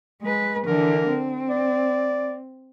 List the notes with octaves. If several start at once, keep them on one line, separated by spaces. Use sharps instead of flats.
G#3 B4
D3 E3 A#4
C4
D5